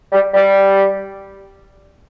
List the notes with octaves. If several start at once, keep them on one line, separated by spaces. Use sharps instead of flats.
G3
G3